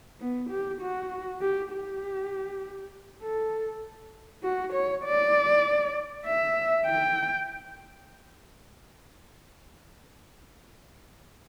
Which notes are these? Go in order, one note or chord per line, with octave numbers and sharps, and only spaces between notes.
B3
G4
F#4
G4
G4
A4
F#4
C#5
D5
E5
G5